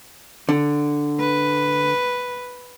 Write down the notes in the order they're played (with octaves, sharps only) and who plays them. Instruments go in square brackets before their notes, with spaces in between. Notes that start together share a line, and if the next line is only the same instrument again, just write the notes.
[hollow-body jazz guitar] D3
[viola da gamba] B4